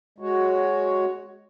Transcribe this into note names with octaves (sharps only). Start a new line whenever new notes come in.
G#3 F#4 C#5